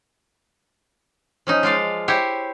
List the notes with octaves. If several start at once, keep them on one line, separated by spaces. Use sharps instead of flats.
F3 C#4 D#4
G#3 F4 D5 F5
E4 G4 C5 C#5